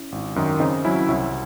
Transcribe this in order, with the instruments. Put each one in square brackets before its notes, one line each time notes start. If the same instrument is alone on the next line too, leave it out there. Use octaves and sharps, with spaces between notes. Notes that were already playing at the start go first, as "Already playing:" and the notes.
Already playing: [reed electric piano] C#4 E4
[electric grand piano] G#1
F#2 D#3
[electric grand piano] C#3 [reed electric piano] C4 D#4
[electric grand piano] F#3 C#4 E4
[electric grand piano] C2 [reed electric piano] C#4 E4